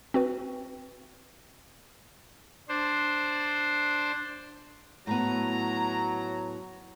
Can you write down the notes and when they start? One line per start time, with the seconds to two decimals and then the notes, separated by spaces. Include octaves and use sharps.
0.14 C4 F#4 B4
2.69 D4 C5
5.07 A2 F#3 B3 A#5